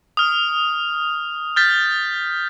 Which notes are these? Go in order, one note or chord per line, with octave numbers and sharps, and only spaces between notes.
D#6 F6
F6 G6 A6 B6